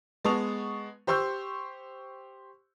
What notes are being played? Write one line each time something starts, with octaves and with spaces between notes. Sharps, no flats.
G#3 B3 A5 C#6 D#6 F7
G4 C5 C6 C#6 E6 G6